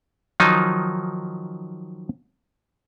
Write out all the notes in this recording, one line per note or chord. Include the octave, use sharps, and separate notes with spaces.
D#3 F3 F#3 D#4